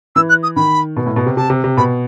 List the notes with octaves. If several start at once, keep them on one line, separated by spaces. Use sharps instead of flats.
E3 E6
F#6
D#6
D#3 B5
B2
A2
B2
C3
C3 A5
C3
C3
B2 B5